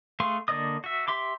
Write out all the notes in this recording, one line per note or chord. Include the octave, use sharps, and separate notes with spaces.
A3 G#4 F5 C6 C#6
D3 A#3 D5 D#5 D#6
F#4 E5
G4 E5 C6 D6